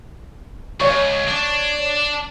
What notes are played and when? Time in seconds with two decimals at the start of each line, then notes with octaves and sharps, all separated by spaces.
0.80 C#2 C#5 C#6
1.28 D4